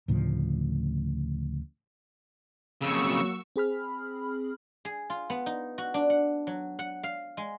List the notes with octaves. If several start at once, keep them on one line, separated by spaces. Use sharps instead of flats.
D2 A2 C#3 F3
F2 C#3 F#3 A#3 F#4 C#6 E6
C4 G#4 B5 F6
G#4
F4
B3
D#4
F#4
D4
F#5
F#3
F#5
F5
G#3